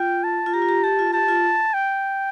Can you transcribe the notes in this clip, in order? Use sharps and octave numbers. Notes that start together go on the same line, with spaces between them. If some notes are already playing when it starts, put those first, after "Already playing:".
Already playing: F4 G5
A5
F4
G4 A#5
F4
G4
G4 A5
F4
G4 A5
F4
G5